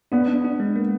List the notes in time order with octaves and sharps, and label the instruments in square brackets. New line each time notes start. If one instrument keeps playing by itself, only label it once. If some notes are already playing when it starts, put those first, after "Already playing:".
[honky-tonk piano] B3 [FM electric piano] D4
[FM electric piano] D4
D4
G#3
A#3